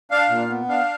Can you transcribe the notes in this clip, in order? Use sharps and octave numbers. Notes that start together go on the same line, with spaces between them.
D4 F5
A#2
B3
D4 F5